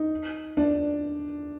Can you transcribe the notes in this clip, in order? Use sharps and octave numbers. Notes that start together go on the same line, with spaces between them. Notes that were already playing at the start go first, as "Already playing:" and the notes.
Already playing: D#4
D4